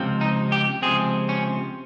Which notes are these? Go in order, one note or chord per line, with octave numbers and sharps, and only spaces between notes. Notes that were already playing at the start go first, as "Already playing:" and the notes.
Already playing: C#2 C3 F3 C4
D#4
G4
C#2 C3 F3 C4 G#4
C#4